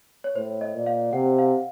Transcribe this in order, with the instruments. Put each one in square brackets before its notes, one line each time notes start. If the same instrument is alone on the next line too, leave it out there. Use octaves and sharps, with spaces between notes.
[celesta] C#5
[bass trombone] A2 [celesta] C5
[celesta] D#5
[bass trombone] A#2
[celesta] F5
[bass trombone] C3 [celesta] F#5
[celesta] F5